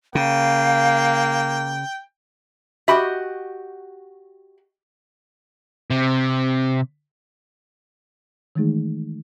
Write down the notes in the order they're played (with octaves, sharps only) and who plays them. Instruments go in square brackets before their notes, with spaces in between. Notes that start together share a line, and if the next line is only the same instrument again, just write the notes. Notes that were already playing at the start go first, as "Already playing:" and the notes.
[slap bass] C#3 [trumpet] A#3 [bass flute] F5 [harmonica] G5
[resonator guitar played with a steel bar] F#4 G4 D#5 [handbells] E5 B5
[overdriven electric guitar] C3
[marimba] D#3 E3 G#3 A3 D#4 G#4